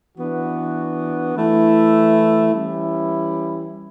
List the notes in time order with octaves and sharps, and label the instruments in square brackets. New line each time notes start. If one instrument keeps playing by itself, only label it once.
[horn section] E3 B3 D4 F#4
E3 A3 E4
E3 G3 C#4 E4